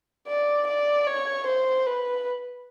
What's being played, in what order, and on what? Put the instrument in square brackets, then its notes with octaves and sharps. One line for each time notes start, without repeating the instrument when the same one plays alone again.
[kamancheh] D5
D5
C#5
C5
B4